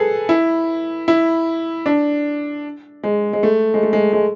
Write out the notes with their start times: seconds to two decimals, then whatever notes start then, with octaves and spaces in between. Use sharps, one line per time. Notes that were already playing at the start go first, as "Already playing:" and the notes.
Already playing: G#4 A4 B4
0.29 E4
1.08 E4
1.86 D4
3.04 G#3
3.33 G#3
3.43 A3
3.74 G#3
3.83 A3
3.93 G#3
4.13 G#3